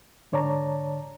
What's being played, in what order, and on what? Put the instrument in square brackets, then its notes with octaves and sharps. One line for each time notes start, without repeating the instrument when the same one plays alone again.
[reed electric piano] G#2 D3 C#5 D5 A5 A#5